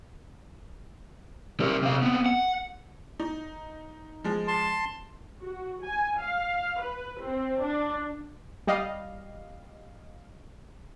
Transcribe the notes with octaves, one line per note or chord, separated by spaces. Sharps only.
G3 A#4
C3 F5
B3 C4
F#5
D#4
F3 G#3
A5 C6
F#4
G#5
F5
B4
C4
D4
G3 D#5 F5